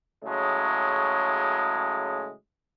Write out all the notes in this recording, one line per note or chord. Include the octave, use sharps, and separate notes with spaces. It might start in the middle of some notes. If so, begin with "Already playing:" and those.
A2 C#3 F#3 G#3